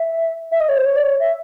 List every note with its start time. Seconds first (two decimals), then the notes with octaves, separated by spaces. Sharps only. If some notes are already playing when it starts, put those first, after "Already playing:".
Already playing: E5
0.51 E5
0.60 D#5
0.69 C#5
0.77 C5
0.85 C#5
0.96 D5
1.03 C#5
1.20 E5